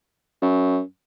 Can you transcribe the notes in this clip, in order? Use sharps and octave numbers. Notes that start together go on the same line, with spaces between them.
F#2